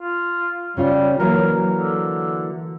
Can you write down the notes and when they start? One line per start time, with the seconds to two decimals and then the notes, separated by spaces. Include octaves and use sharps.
0.01 F4
0.77 C#3 G3 C#4 F4
1.20 E3 F#3 A#3 A#4
1.73 D3